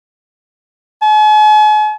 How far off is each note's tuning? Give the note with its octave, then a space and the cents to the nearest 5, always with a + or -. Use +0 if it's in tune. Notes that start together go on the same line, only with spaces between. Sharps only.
G#5 +45